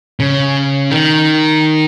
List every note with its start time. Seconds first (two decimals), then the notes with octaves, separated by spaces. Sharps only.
0.20 C#3
0.90 D#3